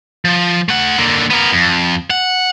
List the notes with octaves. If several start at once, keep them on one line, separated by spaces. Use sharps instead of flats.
F3
A3 F#5
D3 A#3
B3 A#4
F2
F#5